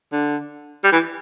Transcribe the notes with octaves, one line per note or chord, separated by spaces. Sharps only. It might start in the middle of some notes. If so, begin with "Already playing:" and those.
D3
G3
E3